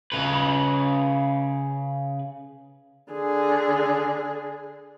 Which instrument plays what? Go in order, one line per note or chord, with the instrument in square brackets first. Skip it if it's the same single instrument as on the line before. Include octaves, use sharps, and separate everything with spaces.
[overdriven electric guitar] C#3 B4
[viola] D3 G#4